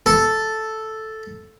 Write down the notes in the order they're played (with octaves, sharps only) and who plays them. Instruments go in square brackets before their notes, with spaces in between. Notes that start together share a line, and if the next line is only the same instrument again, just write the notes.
[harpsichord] A4